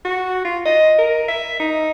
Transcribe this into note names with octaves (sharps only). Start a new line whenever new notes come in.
F#4
F4
D#5
A#4
E5
D#4